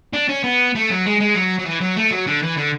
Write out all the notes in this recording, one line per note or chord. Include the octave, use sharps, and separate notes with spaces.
D4
C#4
B3
A3
F#3
G#3
G#3
F#3
F#3
E3
F#3
A3
F#3
D3
E3
D3